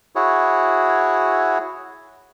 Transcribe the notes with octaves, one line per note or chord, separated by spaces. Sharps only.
E4 F#4 G#4 C#5